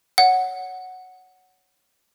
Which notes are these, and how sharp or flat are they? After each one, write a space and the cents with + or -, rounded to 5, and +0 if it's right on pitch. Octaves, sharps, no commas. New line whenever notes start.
C#5 +10 F#5 +0